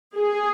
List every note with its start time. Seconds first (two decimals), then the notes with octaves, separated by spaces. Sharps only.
0.17 G#4